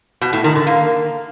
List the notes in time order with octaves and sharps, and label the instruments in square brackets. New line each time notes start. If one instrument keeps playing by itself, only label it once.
[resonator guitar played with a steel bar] B2
A2
D#3
D3
A#3